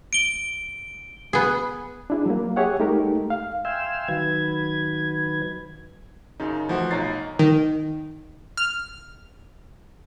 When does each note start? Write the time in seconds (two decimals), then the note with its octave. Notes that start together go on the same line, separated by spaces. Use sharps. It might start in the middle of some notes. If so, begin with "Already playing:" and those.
0.13 D7 G7
1.33 B3 G#4
2.10 D4 E4 G#4
2.26 F#3 A#3
2.56 G4 G#4 C#5 E5 F#5
2.80 G#3 A3 D#4 G4 A4 A#4
3.30 F5
3.65 E5 F5 G5 G#5 C6 E6
4.08 D#3 F#3 B4 G#6
6.40 F#2 C#3 D#4
6.68 E3 F3 A3 F#4
6.91 B1 D#4 C#5 A#5 A6 C7
7.39 D#3
8.57 F6